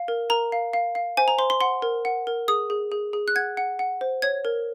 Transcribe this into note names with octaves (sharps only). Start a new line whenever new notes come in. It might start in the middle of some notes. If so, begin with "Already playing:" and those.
Already playing: F5
A#4
A#4 A#5
F5
F5
F5
C5 G#5
A#5
C5 C6
C6
F#5 C6
A#4
F#5
A#4
G#4 D#6
G#4
G#4
G#4
F#6
F#5 G#6
F#5
F#5
C5
C#5 G#6
A#4